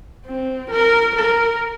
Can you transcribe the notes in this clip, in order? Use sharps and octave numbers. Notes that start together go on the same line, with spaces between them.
C4
A#4
A#4